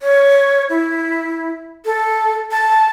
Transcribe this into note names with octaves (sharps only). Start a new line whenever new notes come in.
C#5
E4
A4
A5